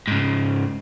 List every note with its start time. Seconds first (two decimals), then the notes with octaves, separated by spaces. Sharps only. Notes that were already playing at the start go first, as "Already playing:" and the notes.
0.07 G#2 C#3